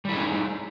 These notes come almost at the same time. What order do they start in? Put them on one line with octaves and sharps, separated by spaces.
G3 E4 G#4 C#4 D#4